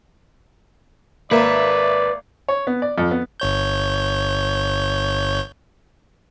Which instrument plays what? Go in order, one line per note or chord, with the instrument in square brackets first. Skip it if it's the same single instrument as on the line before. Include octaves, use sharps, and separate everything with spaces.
[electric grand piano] G#1 E5 [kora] A#3 [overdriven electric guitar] B4 [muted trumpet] D5
[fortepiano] C#5
B3
D5
F2
B3
[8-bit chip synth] G1 C#5 G6